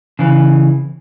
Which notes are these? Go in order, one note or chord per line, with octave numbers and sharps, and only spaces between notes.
C#3 E3